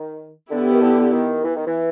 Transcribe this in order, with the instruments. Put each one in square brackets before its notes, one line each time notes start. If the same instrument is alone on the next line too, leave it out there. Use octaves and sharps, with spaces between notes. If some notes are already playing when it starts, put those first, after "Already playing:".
Already playing: [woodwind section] D#3
[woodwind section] D3 [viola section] B3 E4 G4
[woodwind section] D#3
D3
D#3
E3
D#3
E3